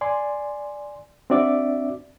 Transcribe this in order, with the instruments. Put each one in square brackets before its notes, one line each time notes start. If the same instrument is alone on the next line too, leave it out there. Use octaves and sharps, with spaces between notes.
[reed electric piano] D5 G#5 C6
C4 D4 F#4 D5 E5 D6